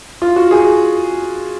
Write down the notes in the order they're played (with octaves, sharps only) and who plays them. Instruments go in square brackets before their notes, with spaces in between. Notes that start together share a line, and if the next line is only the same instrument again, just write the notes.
[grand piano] F4
F#4
G#4